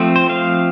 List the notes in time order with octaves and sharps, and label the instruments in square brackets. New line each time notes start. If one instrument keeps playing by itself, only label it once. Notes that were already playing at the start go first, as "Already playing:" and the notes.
Already playing: [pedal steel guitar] F3 A3 C4
C5
F5